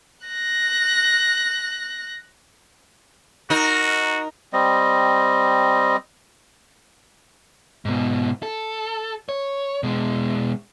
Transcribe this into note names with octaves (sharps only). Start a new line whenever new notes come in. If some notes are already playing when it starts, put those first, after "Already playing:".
F#6 A#6
D#4 F#4 A#4
G3 C4 D#5
G#2 B2
A4
C#5
B2 G#3